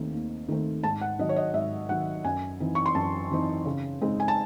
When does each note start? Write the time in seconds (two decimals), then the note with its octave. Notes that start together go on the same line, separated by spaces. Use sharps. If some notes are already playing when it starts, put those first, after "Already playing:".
Already playing: D#2 D#3 A3 C4
0.14 D#2
0.49 D#3 A3 C4
0.84 G#2 A5
1.01 F#5
1.19 D#3 F#3 D#5
1.29 C#5
1.36 D#5
1.54 G#2 E5
1.89 D#3 F#3 F#5
2.24 F#2 G#5
2.60 E3 C4 D#4
2.75 C#6
2.86 C6
2.95 F#2 A5
3.31 E3 C4 D#4
3.65 C#3
4.01 G#3 C4 D#4
4.20 G#5
4.28 A5